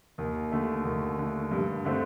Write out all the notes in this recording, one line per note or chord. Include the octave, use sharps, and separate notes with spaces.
D#2
D3 A3
D#2
D3 A3
G2
D3 A3 C4